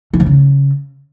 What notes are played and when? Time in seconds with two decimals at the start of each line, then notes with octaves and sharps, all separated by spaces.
0.13 E3
0.20 F2
0.26 C#3